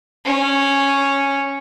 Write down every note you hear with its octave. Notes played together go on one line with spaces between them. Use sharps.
C#4